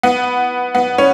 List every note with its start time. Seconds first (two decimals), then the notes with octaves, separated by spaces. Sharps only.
0.03 B3
0.75 B3
0.98 C#4